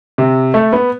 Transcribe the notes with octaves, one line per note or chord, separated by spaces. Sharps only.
C3
A3
B3